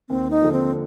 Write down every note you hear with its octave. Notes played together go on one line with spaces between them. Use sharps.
D#2 C4
D#4
D3 F3
C4